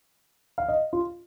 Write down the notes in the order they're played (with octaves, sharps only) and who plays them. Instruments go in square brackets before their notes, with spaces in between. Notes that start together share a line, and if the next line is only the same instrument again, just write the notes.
[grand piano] F5
D#5
F4